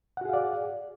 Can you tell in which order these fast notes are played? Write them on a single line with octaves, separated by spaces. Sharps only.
F#5 F#4 G#4 F5 D5